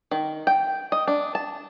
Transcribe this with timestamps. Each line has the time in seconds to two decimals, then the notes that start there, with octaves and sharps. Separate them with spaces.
0.11 D#3
0.47 G5
0.92 D#5
1.08 D4
1.35 A5